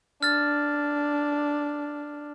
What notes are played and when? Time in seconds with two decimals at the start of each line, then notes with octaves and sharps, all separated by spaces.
0.23 D4 F6 A6